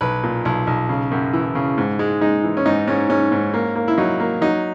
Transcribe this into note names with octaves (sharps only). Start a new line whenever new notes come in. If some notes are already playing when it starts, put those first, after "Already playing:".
B1 B4
A#2
B1
B1
C#3
F#2
E3
C#3
G#2
G#3
G#3 D#4
E3
C#4
G#2 D#4
G#2 C#4
G#2 C#4
G#2
A#3
A#3
E4
F#3 D#4
A#3
F#3 D#4